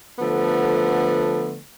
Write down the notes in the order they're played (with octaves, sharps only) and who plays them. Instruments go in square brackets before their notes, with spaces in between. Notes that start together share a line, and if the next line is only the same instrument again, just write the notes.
[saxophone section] D3 F3 A3 B3